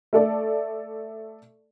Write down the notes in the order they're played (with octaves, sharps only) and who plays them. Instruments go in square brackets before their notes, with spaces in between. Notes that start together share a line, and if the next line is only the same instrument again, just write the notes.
[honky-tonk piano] A3 A4 D5